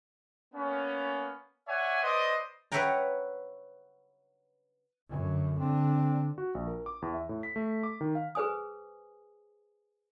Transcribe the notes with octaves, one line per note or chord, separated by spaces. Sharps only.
A#3 B3 C#4
C#5 D5 E5 F#5 G#5
B4 C5 D5 D#5
B4 C#5 E5 F#5 G5 A#5
F#2 D3
D3 C4 D4
F#4
A#1
A#4
D6
E2
E5
A2
B6
A3
D6
D#3
F5
G#4 B4 C5 G#5 D#6